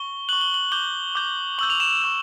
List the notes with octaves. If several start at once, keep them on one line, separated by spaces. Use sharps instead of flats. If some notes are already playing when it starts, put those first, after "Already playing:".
Already playing: C#6 G7
C#6 F#6 F#7
G7
F#7
D6 G6 G7
D6 G6
C#6 E6 G6 F#7
F7
E7
E7
C#6 E6 G6